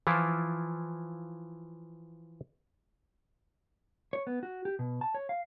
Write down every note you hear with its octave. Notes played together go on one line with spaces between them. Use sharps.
E3 F3 E4 F4
C#5
B3
F#4
G4
B2
A5
C#5
F5